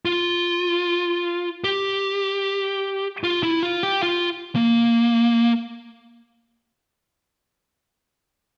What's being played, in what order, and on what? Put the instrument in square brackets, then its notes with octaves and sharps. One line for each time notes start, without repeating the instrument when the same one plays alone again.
[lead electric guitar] F4
G4
F4
E4
F4
G4
F4
A#3